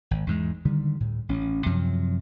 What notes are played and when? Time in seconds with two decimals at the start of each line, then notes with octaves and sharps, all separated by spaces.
0.11 G#1
0.27 E2 G#2 G#3
0.65 D3 D#3 G3
1.00 D2 A2
1.29 A1 C#4
1.66 F#2 C3 F3 F#3